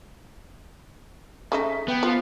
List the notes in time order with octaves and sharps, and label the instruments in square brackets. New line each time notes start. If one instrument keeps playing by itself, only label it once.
[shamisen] C#3 A3 D#4 [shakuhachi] E5
[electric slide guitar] B3 [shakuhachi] G5
[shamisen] F3 [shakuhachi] F4